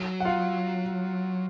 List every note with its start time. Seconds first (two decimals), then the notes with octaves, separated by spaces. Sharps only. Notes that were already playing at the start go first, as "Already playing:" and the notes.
Already playing: F#3
0.20 F#5
0.25 F4 F5